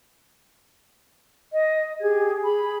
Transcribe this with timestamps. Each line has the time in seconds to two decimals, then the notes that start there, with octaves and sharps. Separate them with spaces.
1.51 D#5
2.00 G4 G#4 G#6
2.44 G#4 B5